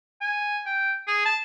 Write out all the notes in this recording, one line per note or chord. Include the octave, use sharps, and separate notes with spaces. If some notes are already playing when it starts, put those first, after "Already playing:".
G#5
G5
G#4
A5